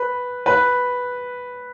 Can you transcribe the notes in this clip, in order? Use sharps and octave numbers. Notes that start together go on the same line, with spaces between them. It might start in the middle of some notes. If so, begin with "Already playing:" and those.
Already playing: B4
B4